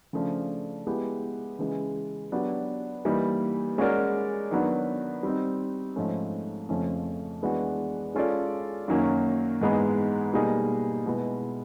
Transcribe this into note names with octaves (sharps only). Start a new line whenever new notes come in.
C#3 F3 A3 D4
G#3 B3 E4 G4
C#3 E3 G#3
F#3 B3 D4 G4
E3 G3 A#3 D#4
G#3 C#4 F#4 A#4 D5
D#3 F#3 B3 D4
G3 C4 D#4
G#2 F3 A3 C#4
F2 C#3 F3 A3 C#4
E3 G#3 B3 D4 F#4
G#3 C#4 F4 A4 D5
F#2 D#3 F#3 A#3 C#4
G#2 E3 G#3 B3
B2 G3 A#3 D#4 G#4
B2 G#3 B3 E4